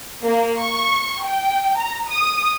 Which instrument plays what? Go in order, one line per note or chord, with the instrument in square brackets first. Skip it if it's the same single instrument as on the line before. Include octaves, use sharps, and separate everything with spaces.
[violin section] A#3
C#6
G5
A#5
D#6